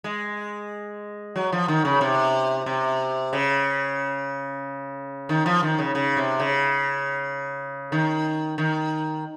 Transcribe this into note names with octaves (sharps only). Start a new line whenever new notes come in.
G#3
F#3
F3
D#3
C#3
C3
C3
C#3
D#3
F3
D#3
C#3
C#3
C3
C#3
D#3
D#3